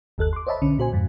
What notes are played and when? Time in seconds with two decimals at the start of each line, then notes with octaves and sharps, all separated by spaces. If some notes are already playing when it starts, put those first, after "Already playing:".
0.18 G1 D#2 A4 F#6
0.33 C6 D6
0.47 C5 C#5 D#5 E5 A5 B5
0.62 B1 D3 C#4
0.78 A#2 F#4 C5 G#5
0.93 F2 G#2